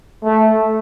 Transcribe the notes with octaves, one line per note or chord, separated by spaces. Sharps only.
A3